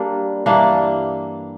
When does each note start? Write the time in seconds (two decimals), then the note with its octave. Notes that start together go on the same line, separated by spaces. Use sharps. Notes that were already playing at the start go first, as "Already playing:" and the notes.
Already playing: G3 A#3 D4
0.46 G2 E3 G3 A#3 D4